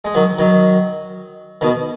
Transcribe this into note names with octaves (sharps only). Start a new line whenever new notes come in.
G#3
D#3 F#3
D#3 F#3
B2 D#3